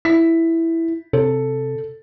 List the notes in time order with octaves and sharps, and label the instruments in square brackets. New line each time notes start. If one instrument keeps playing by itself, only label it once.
[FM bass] E4 [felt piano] B6
[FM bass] C3 [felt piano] A4